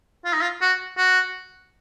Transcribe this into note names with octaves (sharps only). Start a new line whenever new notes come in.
F4
D#4
F4
F#4
F#4